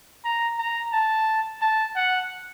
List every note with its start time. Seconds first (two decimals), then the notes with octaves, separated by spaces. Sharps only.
0.25 A#5
0.59 A#5
0.93 A5
1.62 A5
1.96 F#5